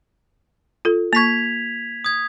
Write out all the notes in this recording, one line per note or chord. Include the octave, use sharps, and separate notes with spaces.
F4 A4
A#3 C#6 G#6 B6 F7
D#6 G#6